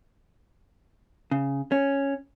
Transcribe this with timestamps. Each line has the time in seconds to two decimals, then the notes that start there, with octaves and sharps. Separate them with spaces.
1.31 C#3
1.72 C#4